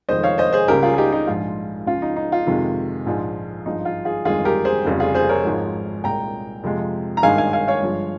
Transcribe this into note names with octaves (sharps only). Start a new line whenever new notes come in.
F1 F2 D#3 G#3 C5 D#5
C#5 F5
C5 D#5
G#4 C5
C#2 C#3 G3 G4 A#4
F4 G#4
G#4
D#4 G4
D#4 G4
A#1 G#2 F3 G#3 F4
C#2 C#3 F3 F4
D#4
D#4
F4
F2 C3 D#3 G#3
A#1 G#2 F3 G#3
G#1 G2 F3 G#3 D#4
F4
F4 G#4
G1 F2 D#3 G#3 F4 G#4
G4 A#4
G#4 C5
F1 F2 C#3 G3
F4 G#4
G#4 C5
A#4 C#5
G#1 G#2 F3 G#3
C2 A#2 G#3 G5 A#5
F2 C3 F3 G#3
A#5
G#1 G2 D#3 G#3 F5 G#5
F5 G#5
F5 G#5
C#5 F5
G1 G2 F3 G#3